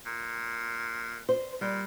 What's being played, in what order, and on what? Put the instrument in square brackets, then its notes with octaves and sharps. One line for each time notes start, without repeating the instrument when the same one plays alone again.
[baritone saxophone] A#2
[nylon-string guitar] C5
[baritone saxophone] A#2 [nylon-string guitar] G3